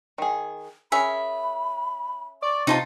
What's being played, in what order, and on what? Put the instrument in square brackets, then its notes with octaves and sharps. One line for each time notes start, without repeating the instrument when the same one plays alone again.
[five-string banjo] D#3 G#4
[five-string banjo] C#4 G#4 A#4 [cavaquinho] E5 [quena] B5
[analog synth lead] D5 [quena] C#6
[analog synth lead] C3 [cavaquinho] D#4 F4 A5